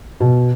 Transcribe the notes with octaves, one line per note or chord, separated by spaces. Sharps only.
B2